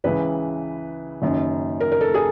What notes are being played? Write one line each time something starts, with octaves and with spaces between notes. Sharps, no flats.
C#2 C#3 E3 B4
F#1 F#2 D#3
A#4
A#4
A4
G#4